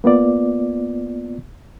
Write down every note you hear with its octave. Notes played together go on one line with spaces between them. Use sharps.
A#3 B3 F4 D5